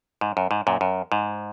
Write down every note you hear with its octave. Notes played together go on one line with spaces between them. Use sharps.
G#2
F#2
G#2
F#2 A#2
F#2
G#2